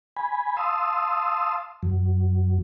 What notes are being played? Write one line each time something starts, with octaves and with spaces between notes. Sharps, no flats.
G#5 B5
F5 A5 C6 D#6 E6
F#2 F#3